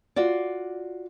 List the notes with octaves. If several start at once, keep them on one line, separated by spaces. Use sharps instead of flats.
F4 F#4 D5